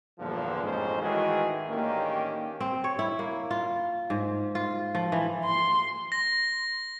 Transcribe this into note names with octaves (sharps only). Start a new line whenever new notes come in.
E2 G2 A#2 D3 F3
A1 F2 G#2 C#4 G#4 C5
D#3 E3 G#3 A3 F#4 G#4
A1 D#3 A#3 C#4 D4 G4
C4
C#5
E4
A#3
F4
G#2
F4
F3
E3
C6
A#6